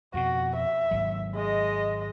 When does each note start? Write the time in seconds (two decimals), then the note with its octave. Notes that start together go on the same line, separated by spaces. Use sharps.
0.14 F2 B2 F#4
0.56 E5
0.91 G#1 F#3
1.35 G#3 D#5